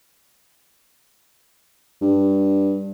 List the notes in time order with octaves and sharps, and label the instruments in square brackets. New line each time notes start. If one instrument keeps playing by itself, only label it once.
[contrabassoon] G2